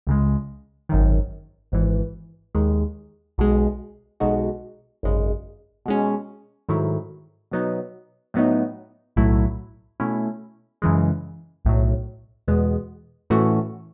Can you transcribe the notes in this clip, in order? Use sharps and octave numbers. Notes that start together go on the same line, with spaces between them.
C#2 C#3 G#3
G#1 F#2 D#3
G#1 G#2 E3
D#2 D#3 G#3
B1 B2 G#3
B1 B2 G#3 D#4 F#4
G#1 F#2 C#3 G#3
B2 G#3 C#4
G#2 D#3 F#3 A3 E4
B2 F#3 B3 D#4
A2 F#3 B3 D#4
B1 A2 F#3 A3 E4
B2 A3 C#4 E4
F#2 C#3 E3 G#3
B1 A2 F#3
E2 B2 G#3 B3
A2 E3 A3 C#4 F#4